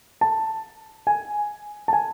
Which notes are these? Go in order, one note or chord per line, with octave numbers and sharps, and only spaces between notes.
A5
G#5
A5
G#5